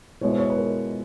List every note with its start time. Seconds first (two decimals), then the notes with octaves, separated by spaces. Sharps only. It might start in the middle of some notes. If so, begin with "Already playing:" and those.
0.21 B2 G#3 B3 E4 C#5
0.30 C5
0.38 C#5
0.50 B4
0.57 A#4